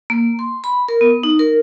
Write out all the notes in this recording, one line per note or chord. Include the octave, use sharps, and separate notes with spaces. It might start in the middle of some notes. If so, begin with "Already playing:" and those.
A#3
C6
B5
A#4
B3
D#4
A#4